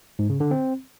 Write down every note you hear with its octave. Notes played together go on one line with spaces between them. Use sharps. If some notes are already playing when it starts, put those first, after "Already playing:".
G#2
C#3
D3
C4